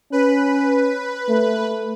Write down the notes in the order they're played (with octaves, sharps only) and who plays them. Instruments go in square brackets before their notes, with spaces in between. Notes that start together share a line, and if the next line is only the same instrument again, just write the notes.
[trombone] C#4 [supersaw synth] B4
[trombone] A3